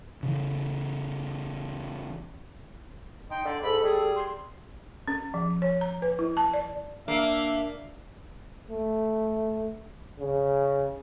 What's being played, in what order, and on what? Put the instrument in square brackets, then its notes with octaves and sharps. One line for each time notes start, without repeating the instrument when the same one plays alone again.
[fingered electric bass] C#3 E3
[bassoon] D#4 [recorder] G5 [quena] C6
[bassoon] D3 [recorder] D5
[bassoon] G#2 [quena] A4 [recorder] B5
[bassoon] G3 [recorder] G#4
[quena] C6
[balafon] C#4
F3
C#5
A#5
B4
E4
A5
D5
[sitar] A#3 [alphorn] D4 [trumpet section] E5
[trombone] A3
C#3